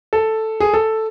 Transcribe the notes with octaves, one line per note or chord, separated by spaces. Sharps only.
A4
G#4
A4